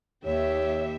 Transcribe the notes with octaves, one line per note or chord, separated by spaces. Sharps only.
D#2 G4 C#5 E5